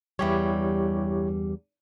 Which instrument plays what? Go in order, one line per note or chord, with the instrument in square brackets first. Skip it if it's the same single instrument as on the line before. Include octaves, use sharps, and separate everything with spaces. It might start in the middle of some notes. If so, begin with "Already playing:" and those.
[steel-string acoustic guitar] E2 G2 G3 [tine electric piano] E4 G4 C#5